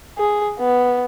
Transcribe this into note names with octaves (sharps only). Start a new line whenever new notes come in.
G#4
B3